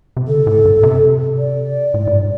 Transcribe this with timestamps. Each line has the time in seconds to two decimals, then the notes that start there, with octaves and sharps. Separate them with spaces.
0.17 C3
0.28 D3 A4
0.47 A2
0.65 G2
0.83 C3
1.38 D5
1.94 A2
2.07 A2
2.13 G2